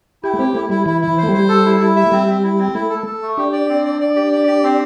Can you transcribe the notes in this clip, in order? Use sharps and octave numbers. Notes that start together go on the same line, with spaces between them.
E4 G4
A3
C4 G4
A3 E4
G3 E4
E3 E4
E4
E3
C5
A3
G3
C5
A4
E4
E4
E5
A3
G3 C4
C4
E4
C4
A3 E4
A4
A4
A3
D4 G4
D5
C4
D5
D5
G4
D5
G4
C4